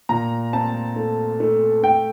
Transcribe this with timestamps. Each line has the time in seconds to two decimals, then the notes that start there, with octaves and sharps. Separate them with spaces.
0.09 A#2 A#5
0.53 C4 A5
0.96 A3
1.40 A3
1.83 A3 G5